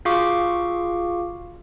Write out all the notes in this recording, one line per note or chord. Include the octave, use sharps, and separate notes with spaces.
F4 F#4 G#4 F5 C#6 D6